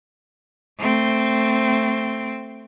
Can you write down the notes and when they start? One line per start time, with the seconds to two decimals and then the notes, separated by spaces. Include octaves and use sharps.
0.78 A3 C4